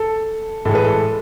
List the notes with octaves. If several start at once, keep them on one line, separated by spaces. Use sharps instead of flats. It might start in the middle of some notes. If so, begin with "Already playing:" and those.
Already playing: A4
A2 E3 G#3 A4
B4
A4